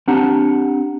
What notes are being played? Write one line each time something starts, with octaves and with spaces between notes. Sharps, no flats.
C4 D4 G4 F#5 A5 A#5